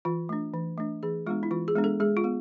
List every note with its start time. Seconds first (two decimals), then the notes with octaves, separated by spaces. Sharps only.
0.05 E3 F4
0.29 A3 D4
0.54 E3
0.78 A3 D4
1.03 E3 G#4
1.27 G#3 B3 D4 F4
1.43 E4
1.51 E3 F4
1.68 G#4
1.76 G#3 B3 D4
1.84 A4
2.00 G#3 G#4
2.17 F4
2.24 B3